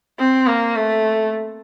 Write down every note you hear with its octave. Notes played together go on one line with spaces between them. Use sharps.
C4
A#3
A3